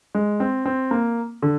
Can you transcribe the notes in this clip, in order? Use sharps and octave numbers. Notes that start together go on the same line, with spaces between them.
G#3
C4
C4
A#3
D3